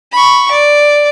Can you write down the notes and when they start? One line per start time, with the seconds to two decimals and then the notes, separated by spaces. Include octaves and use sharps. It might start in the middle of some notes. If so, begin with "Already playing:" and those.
0.12 B5 C#6
0.51 D5